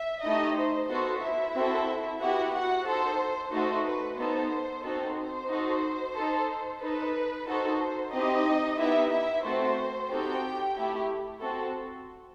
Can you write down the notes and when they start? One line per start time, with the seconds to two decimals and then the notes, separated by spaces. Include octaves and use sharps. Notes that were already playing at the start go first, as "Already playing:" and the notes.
Already playing: E5
0.23 A3 D#4 E4 G4 D#5
0.56 C5
0.89 B3 F#4 A4 C5
1.22 E4 E5
1.55 C4 F#4 A4
2.20 B3 E4 F#4 G4 F#5
2.54 F#4 F#5
2.86 D#4 A4 C5
3.52 A3 D#4 F#4 A4 C5
3.84 B4
4.18 B3 D#4 A4 C5
4.84 C4 D#4 F#4 A4
5.16 C5
5.49 D#4 F#4 A4
6.15 D#4 A4
6.81 D#4 A4 B4
7.47 D#4 F#4 A4 C5
8.12 C4 D#4 E4 G4 D#5
8.78 B3 D#4 E4 G4 E5
9.11 E4 E5
9.44 A3 C4 F#4 A4 C5
10.10 C4 D#4 F#4 G4 A4 G5
10.76 A3 E4 G4
11.41 C4 F#4 A4